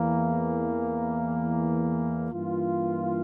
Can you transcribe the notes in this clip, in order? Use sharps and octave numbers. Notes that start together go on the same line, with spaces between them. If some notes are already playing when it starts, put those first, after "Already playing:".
Already playing: E2 E3 A#3
G2 E3 A#3 F4